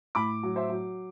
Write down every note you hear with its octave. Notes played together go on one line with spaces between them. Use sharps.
A2 B5 D6
F#3
C5 E5
F#3